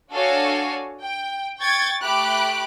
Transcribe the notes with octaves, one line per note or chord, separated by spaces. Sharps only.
D4 F#4 A4 C#5 F5 G#5
G5
G5 C#6 G#6 A6
A3 G4 B5 D6 F#6 D7